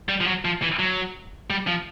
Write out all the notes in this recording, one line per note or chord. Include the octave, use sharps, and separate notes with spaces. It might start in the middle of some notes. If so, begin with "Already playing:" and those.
G3
F3
F#3
F3
E3
F#3
G3
F3